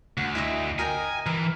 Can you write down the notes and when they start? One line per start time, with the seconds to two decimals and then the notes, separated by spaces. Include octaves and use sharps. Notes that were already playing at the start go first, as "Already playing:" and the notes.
0.17 D2 F#5
0.35 E4 D#5 E5
0.79 A#4 D#5 G5 G#5
1.26 E3 A#4